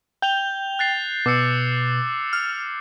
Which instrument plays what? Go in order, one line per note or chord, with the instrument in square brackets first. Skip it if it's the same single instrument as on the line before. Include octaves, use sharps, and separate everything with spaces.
[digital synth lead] G5 [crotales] G6 F7 G7
[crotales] F#6 A6 C7
[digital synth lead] B2 [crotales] D6 E6 C#7
[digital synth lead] F6